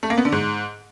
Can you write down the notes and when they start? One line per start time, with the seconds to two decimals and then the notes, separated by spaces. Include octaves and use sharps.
0.03 A3
0.10 A#3
0.18 B3
0.25 D3
0.32 G#2